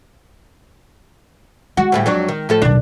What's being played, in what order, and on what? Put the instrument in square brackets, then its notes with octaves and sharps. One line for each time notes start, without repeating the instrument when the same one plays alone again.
[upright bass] G#3 [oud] F#4
[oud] D2 A2 G3
F2 F#3 D4
D#3
A2 F3 A4
[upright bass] D#1 B1 [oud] D4